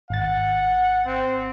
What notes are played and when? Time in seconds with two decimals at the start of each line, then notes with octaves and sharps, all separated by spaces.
0.10 G#1 F#5 A6
1.06 C4